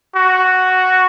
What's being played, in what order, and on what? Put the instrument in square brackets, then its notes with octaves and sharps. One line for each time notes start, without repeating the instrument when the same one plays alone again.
[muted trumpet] F#4